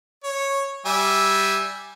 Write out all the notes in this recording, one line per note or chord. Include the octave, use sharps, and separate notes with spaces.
C#5
G3 E5 G#5